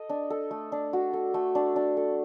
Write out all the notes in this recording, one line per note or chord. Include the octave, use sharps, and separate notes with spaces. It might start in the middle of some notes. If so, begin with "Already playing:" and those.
Already playing: A4 D#5
D4
A4
A3
D4
F#4
A4
A3
D4
D4
A4